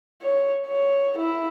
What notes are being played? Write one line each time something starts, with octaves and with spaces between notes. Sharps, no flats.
C#5
C#5
E4